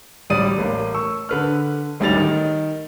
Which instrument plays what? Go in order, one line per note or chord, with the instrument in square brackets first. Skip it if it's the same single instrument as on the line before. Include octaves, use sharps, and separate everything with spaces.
[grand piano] D1 A1 G3 D5 D#6 D#7
A1 A#3
C#6 E6
D3 B4 F6
A1 D2 G3 D#4 A6 F7
D#3